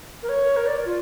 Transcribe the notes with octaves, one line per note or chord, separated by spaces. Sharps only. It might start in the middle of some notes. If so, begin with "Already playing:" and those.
A#4
C#5
A#4
D5
F4